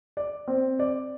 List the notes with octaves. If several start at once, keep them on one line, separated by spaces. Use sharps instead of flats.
D5
C4
D5